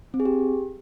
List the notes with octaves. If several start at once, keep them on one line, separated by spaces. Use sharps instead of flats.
C4
G#4
G4